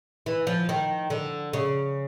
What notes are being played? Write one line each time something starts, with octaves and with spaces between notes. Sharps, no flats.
E3
F3
D#3
D3
C#3